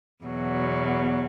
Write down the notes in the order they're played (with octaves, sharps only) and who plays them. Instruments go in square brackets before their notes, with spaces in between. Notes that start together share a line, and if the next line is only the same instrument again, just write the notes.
[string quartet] E2 B2 F#3